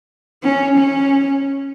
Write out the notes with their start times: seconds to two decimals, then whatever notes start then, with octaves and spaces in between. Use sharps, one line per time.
0.44 C#4
0.78 C#4